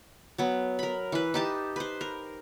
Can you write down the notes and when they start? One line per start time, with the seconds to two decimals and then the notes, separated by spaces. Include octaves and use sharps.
0.38 F#3 B3
0.79 A#4 B5
1.12 E3 B4
1.34 D#4 G4 A5
1.76 B4 C5
2.01 A#4